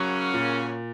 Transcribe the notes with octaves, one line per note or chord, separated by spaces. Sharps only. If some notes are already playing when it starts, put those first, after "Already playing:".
Already playing: C#3 F#3 A#3 C#4 F#4
A#2